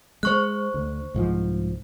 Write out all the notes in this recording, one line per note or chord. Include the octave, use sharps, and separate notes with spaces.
G#3 C5 C#6 F#6
D2
C2 G#2 F3